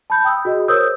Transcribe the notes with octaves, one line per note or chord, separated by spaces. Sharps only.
A5 B5 G6
G5 D#6 E6
F#4 G#4 D#5
A#4 C5 C#5 D#6 E6 G6